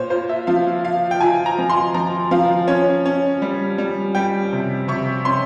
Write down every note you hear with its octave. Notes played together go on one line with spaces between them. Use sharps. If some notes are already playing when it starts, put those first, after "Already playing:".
Already playing: A#2 C5 C#5
F4 C5
E5
F3 F5
F4 F5
G5
F4 G#5
A#5
F3
C6
F3 A#5
F3 F5
C#4 C#5
C#4
G3
G3
G3 G5
C3
C3 C#6
C#4 C6